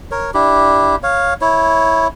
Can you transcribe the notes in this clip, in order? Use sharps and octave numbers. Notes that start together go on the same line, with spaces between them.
A#4 C#5
D4 E4 G4
C#5 F5
E4 C#5